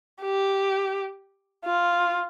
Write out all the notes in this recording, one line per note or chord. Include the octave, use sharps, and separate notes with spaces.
G4
F4